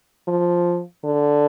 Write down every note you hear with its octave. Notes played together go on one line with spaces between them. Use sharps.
F3
D3